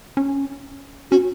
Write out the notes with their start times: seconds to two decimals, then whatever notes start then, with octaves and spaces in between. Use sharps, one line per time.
0.17 C#4
1.11 C#4 F#4